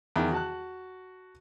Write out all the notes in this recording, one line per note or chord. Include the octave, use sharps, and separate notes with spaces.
E2 D#3
F#4 A5 F#6